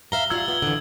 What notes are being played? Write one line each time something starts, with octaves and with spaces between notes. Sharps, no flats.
E5 F5 A#5 G7
G3 F4 F#4 E6 G#6
B3
D3 E3